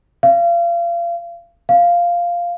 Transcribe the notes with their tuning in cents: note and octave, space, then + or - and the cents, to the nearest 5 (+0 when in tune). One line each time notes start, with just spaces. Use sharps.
F5 -30
F5 -5